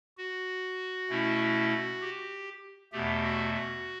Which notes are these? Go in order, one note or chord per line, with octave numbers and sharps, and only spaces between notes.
F#4
B2 A3 C#4 E4
G4
E2 B2 A3 G4
F#4
F#4